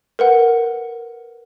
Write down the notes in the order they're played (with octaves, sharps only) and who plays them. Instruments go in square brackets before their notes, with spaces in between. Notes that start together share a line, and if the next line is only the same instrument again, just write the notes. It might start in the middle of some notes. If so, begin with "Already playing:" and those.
[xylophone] A#4 B4 F#5